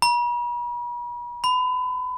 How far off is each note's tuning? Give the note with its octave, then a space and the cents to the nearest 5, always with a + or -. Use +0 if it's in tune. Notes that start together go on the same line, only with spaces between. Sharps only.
B5 -45
B5 +30